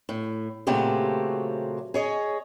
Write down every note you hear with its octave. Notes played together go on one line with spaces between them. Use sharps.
A2
A#2 C#3 F#3 A3 C4 G4
G#4 C#5 D#5